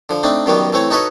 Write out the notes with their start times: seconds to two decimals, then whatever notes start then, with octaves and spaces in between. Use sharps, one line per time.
0.09 D3 F3
0.23 A3 C4 D4 D#4
0.46 F#2 B2 D#3 F#3 G3 B3
0.73 E3 A3 C4 C#5
0.90 D#4 F#4 A4 B4 C#5 D#5